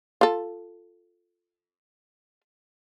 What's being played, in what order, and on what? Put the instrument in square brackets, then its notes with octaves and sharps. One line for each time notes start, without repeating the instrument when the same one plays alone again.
[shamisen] F4 A4